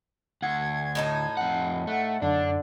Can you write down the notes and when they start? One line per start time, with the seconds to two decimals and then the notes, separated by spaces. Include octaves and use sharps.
0.42 D2 F#5 G#6
0.95 A2 D#4 A4
1.37 F2 F#5
1.87 A3 F#5
2.22 F#2 D3 D4